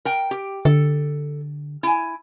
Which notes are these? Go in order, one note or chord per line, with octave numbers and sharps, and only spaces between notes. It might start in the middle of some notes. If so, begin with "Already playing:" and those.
A#4 G5
G4
D3 A4
E4 G#5